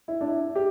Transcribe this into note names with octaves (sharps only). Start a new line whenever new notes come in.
E4
D4
E4
G4